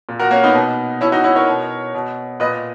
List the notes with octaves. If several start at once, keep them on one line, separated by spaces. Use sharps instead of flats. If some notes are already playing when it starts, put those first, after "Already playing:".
A#2
F#4 A#4
A#3 C#4
B3 D#4
B2
B2 C#4 E4
D#4 F#4
C#4 E4
A#4 C#5
B2
B2
A#2 B4 D#5